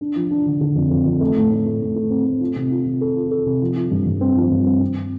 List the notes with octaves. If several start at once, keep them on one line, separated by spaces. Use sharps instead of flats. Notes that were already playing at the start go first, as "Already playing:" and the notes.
D4
F3
D4
D3
D3
F2
F2
F2
A3
A2
A2
A3
A2
A3
C4
A3
F4
C3
F4
C3
A4
F4
A4
C3
F3
F3
G2
G2
C4
F3
G2
C4
C4